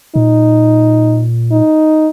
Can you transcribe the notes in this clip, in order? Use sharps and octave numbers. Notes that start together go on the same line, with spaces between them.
A#2 D#4
D#4